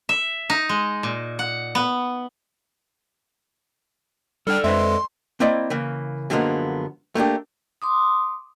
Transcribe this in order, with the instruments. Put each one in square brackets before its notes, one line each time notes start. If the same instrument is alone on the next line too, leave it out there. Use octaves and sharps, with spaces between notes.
[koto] E5
D#4
G#3
A#2
F#5
B3
[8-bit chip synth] G3 D4 G5 [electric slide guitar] A4 D5 [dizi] F6
[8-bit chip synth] F2 G#3 [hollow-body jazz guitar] B4 C5 E5 [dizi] C6
[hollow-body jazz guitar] A#3 C4 E4 D5 D#5
C#3 E3 A#3
F#2 D3 F3 G#3 A#3 B3
A3 A#3 D4 G4
[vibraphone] C6 D6 D#6